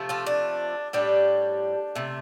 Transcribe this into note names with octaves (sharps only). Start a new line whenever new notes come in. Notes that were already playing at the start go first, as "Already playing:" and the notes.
Already playing: C3 F3 A3
F4 A4
D4
A2 G3 D4 G4
C3 A3